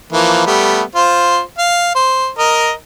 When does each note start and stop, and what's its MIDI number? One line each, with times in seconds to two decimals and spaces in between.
0.12 0.46 52
0.12 0.46 53
0.12 0.46 58
0.47 0.83 55
0.47 0.83 57
0.47 0.83 59
0.95 1.41 65
0.95 1.41 72
1.58 1.91 77
1.95 2.29 72
2.39 2.72 70
2.39 2.72 75